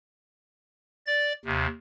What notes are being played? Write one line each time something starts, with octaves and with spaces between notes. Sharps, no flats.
D5 A6
D#2 C3